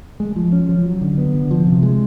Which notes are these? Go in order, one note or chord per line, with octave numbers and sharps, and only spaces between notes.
G#3
F3
C#4
F3
F#3
D3
B3
D3
F3
C3
G#3